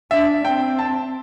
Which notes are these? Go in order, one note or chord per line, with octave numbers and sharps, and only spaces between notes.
D4 E5
C4 G5
A5